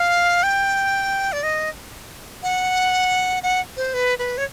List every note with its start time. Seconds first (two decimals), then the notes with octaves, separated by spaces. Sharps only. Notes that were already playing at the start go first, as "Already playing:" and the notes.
Already playing: F5
0.43 G5
1.33 D5
1.43 D#5
2.43 F#5
3.43 F#5
3.77 C5
3.94 B4
4.19 B4
4.38 C#5